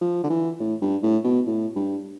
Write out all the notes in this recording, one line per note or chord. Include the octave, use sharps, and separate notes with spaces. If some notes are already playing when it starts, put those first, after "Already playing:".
F3
D3
E3
A2
G2
A2
B2
A2
G2